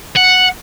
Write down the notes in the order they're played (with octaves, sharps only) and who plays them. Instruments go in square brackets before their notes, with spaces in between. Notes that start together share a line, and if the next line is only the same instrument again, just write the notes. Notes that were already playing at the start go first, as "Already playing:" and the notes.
[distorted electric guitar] F#5